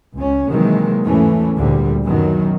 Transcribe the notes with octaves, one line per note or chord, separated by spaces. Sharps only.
C#2 C#4
C3 D#3 E3 F#3 G#3 A#3
E2 G#2 E3 A3 C#4
D2 A#2 D3 G3
F#2 B2 D#3 F#3